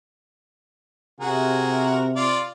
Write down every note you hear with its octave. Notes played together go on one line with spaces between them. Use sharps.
C3 F#4 G#4 A#4
F4 D5